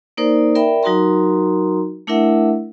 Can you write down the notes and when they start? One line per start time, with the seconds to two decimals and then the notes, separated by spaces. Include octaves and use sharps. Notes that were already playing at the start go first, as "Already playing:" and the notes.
0.17 A#3 D#4 A#4 C5 D5
0.55 A#4 D5 E5 G5 B5
0.83 F#3 D#4 F#4 A#4 A#5 C6
2.07 A3 D4 E4 A#4 E5 F#5